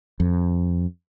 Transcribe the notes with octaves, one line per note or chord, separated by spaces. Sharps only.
F2